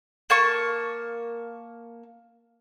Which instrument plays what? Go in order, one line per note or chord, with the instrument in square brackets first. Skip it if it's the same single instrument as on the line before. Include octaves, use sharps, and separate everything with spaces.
[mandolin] A#3 A5 C#6